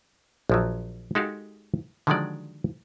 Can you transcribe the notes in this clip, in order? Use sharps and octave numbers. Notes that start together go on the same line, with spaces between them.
A#1 F3 F#3
G#3 D#4 F#4 G4 A4 F5
D3 D#3 F3 F#3 G#3 D5